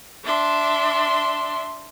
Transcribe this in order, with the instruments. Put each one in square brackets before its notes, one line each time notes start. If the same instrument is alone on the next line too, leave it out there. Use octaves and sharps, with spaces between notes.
[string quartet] D4 E5 C6